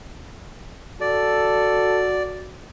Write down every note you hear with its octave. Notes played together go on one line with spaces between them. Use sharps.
F#4 A4 D5